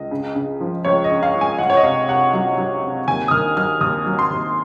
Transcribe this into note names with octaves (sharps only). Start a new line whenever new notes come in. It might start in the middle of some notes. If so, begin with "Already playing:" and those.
Already playing: C#2 D#5
C#3
C#3
F3
C#2 C#5
D#5
C#3
F5
C#2
G#5
C#2 F#5
C#5
D#5
C3 F5
C3 F#5
F#3 F#5
F#3
C3
D#2 G#5
D#6
D#3 F6
F#3 F6
D#2 D#6
F#3
C6
D#2